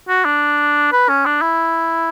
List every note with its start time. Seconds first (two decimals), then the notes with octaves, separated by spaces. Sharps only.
0.09 F#4
0.25 D4
0.92 B4
1.09 C#4
1.26 D4
1.42 E4